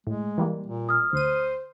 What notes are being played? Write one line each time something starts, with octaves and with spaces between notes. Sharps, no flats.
A2 G#3
E3 G3 A#3
A#2
D#6 F6
D2 C5 D#7